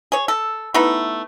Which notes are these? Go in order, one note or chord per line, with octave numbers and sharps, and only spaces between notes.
G#4 C#5
A4
A3 B3 D#4 E4